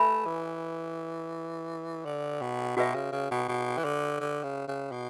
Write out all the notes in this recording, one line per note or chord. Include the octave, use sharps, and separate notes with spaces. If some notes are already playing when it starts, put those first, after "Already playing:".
Already playing: A3 B4 E5 G#5 B5
E3
D3
B2
B2 F#4 B4 E5
C#3
C#3
B2
B2
E3
D3
D3
C#3
C#3
B2